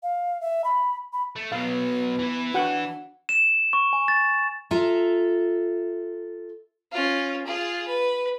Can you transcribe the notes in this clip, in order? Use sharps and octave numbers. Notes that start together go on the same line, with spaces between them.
F5
E5
B5
B5
A3
B2 F#3 B3 F5
E3 E4
D4 F#4 F#5 G5
E7
C#6
G#5
A6
F4 A4 E5 A#5
C#4 F4
F4 G#4
B4